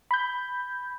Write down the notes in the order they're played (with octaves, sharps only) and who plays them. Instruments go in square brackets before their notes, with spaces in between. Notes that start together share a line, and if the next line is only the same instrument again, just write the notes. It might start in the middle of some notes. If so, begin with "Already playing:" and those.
[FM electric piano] B5 G6